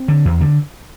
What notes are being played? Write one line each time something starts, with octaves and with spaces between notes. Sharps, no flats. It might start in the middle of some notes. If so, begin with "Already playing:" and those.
Already playing: C4
D3
E2
D3